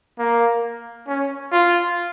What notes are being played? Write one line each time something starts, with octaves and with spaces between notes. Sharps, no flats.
A#3
C#4
F4